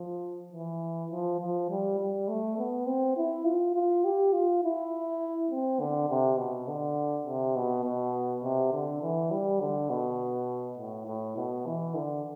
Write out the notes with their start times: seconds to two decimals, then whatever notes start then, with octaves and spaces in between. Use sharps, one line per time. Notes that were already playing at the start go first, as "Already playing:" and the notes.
Already playing: F3
0.52 E3
1.11 F3
1.41 F3
1.70 G3
1.99 G3
2.28 A3
2.58 B3
2.87 C4
3.17 E4
3.46 F4
3.75 F4
4.05 G4
4.33 F4
4.63 E4
5.51 C4
5.80 D3
6.10 C3
6.38 B2
6.68 D3
7.27 C3
7.56 B2
7.85 B2
8.44 C3
8.72 D3
9.02 E3
9.31 G3
9.61 D3
9.90 B2
10.78 A2
11.07 A2
11.37 B2
11.66 E3
11.95 D3